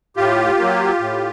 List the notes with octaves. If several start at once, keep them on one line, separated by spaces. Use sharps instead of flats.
A2 F4 G4
F#3 A#3
A2